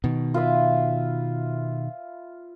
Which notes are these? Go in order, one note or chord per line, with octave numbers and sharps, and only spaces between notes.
B2 D#3
F4 B4 E5